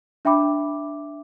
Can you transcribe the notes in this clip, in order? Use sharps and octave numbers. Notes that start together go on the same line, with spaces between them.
D4 E5 G5 B5 D6